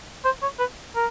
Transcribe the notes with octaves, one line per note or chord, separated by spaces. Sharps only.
C5
C#5
B4
A#4